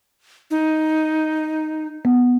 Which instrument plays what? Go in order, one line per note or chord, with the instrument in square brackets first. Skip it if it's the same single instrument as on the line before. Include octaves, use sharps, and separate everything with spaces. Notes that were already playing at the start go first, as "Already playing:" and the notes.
[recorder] D#4
[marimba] B3